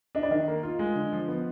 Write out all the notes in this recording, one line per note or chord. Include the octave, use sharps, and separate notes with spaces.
D4 D#5
D5
D#3 D#5
A#3
F4
G#3
D3
F3
B3